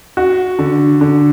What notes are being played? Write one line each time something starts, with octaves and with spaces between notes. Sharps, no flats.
F#4
D3
D3